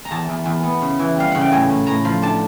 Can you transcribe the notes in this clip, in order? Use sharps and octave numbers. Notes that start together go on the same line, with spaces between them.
A#5
E2 A5
E2
E2
B3
C#3
E3
G3 F5
C#3 F#5
G5
A2 G#5
A2
A2 A#5
F3
D4 A5